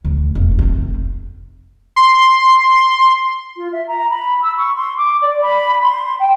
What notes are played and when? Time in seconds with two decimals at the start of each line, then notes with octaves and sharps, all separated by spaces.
0.05 D2
0.35 F1 D#2
0.59 F1 C4
1.96 C6
3.56 F4
3.72 E5
3.87 A#5
4.10 B5
4.42 E6
4.57 C#6
4.76 C6
4.97 D6
5.22 D5
5.42 B5
5.82 C6
6.19 G5